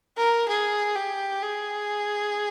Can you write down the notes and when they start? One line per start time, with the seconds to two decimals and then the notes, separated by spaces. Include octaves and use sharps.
0.17 A#4
0.48 G#4
0.95 G4
1.42 G#4